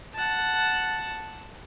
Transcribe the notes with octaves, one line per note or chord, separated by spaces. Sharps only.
F#5 A5